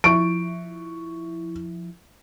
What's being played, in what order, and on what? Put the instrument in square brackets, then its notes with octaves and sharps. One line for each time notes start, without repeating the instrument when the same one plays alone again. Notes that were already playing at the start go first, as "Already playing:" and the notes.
[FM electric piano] F3 E4 [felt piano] C#6 D7